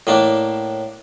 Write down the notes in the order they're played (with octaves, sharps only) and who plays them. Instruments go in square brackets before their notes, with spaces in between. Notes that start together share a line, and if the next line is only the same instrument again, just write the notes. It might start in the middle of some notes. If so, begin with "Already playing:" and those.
[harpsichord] A2 A#3 D4